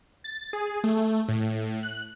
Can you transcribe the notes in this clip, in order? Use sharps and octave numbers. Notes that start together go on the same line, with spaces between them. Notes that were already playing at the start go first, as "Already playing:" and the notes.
A6
G#4
A3
A2
F#6